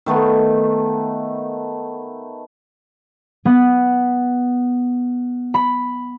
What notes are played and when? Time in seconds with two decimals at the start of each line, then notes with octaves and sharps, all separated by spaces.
0.06 D#3 A3 B3
3.45 B3
5.54 B5